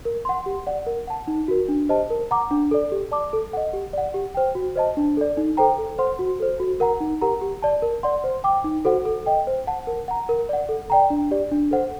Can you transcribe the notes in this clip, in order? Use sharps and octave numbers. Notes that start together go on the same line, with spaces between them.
A#4
F#5 C6
G4
D5 F#5
A#4
F#5 A5
D#4
F#4 A#4
D4
G4 C5 D#5 A5
A#4
F#5 A#5 D6
D4
A4 D5
G4
D5 A5 D6
A4
D#5 F#5
G4
D5 F#5
G4
C5 G5
F#4
C5 D#5 A5
D4
A4 D5
D#4
A4 C5 G5 A#5
A4
C5 F#5 C6
F#4
A4 C5
F#4
A#4 F#5 A#5
D#4
G4 A#4 F#5 A#5
G4
D5 A5
A#4
D5 F#5 C6
C5
G5 D6
D#4
F#4 A4 C5 F#5
A4
D#5 G5
C5
F#5 A5
A#4
F#5 A#5
A#4
D5 F#5
A4
D5 G5 A#5
D4
G4 D5
D4
A4 C5 F#5